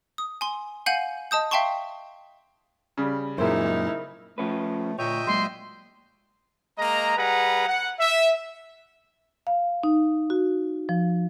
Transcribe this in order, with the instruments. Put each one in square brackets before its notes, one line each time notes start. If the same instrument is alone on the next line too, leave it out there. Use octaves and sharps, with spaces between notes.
[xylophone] D#6
G#5 C6
F5 F#5 G#5 G6 D#7 F#7
D#5 A5 D#6 G6
E5 F5 G5 A5 C6 C#6
[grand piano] C#3 G3
[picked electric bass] F#2 A#2 [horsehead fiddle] D#4 E4 [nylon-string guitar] G#4 A#4 C5
[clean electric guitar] F3 C#4 B4 [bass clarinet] A3
[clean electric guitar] D2 C#5 [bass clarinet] A#2 [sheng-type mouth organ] D#5 E5 G5
[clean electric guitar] A#2 F#3 [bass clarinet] G#3 [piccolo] C6
[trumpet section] G#3 A#3 D#5 A#5
G3 G#4 B4 F#5 A#5
F#5
E5
[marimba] F5
D#4
F#4
F3